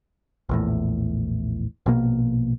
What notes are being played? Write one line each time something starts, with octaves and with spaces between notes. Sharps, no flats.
A#1 E2 A2
A#1 B2 A#3